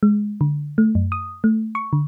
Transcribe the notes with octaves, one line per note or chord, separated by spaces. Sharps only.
G#3
D3
A3
F#2
D#6
A3
C#6
D3